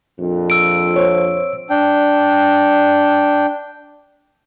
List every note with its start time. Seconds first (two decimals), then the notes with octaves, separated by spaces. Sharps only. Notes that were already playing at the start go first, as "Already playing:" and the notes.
0.19 A#1 F2
0.50 E6 D7
0.96 C5 C#5
1.70 D4 G5